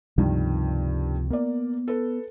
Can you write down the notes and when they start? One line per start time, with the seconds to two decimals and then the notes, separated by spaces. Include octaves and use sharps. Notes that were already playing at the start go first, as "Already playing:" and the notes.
0.18 C#2 G2 C3 D#3 F3
1.30 A#3 B3 D5
1.88 A4 B4